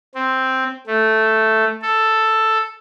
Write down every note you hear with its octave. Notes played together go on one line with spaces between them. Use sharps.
C4
A3
A4